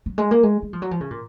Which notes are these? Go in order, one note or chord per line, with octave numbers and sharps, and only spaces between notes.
F#3
G#3
A#3
G#3
G#3
F3
F#3
F3
C#3
A#2